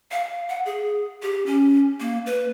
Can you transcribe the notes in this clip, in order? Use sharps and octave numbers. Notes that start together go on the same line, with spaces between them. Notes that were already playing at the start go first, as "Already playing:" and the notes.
F5
F#5
G#4
G4
C#4
A#3
B4